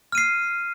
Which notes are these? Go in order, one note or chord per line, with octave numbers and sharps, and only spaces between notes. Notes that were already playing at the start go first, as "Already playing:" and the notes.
F6 C7 D#7